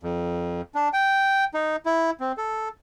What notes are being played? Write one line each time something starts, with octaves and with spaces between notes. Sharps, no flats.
F2
D4
G5
D#4
E4
C4
A4